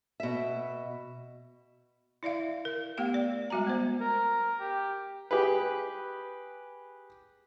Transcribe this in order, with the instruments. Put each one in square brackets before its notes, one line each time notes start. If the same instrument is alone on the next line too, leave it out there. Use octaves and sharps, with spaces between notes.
[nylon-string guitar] B2 E5
[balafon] E4 D5 E5 F5
A#4
A3 B3 G4 F5 G5
D5
G3 G#3 F#4 G#5 A#5
B3 C5
[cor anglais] A#4
G4
[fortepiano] G4 G#4 B4